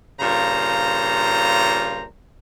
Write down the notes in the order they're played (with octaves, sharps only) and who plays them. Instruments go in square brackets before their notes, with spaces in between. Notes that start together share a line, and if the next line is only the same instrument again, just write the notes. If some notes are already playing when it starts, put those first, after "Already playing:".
[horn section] G2 A#2 C#3 F4 C5 A#5